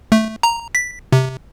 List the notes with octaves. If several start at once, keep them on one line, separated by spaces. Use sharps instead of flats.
A3
A#5
B6
C3